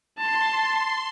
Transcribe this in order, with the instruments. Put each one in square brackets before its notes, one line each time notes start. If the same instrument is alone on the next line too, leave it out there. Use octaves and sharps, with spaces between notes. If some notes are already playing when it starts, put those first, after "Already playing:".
[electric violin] A5 [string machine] C6